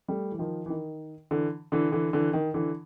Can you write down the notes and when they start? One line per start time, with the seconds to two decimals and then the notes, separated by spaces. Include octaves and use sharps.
0.08 G3 A3
0.32 E3
0.39 D#3 F3
0.66 E3
0.70 D#3
1.31 D3 E3
1.72 D3 E3
1.92 D3 E3
2.13 D3 E3
2.33 D#3
2.54 D3 E3